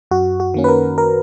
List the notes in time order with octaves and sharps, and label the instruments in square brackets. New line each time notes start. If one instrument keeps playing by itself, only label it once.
[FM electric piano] F#2 F#4
F#4
D#3 A#3 C#4
B4
A#4
A#4